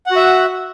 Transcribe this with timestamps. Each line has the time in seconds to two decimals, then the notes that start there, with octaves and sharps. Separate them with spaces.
0.06 F#5
0.11 F#4
0.16 E5